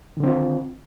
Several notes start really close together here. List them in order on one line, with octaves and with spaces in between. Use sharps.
D#3 D3 C4 F4